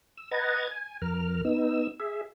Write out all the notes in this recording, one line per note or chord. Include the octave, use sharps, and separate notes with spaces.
E6
B4 D#5 F#5 A#5 G#6 A6
G#5
F2 A#4 F6
B3 D#4 E6
G#4 E5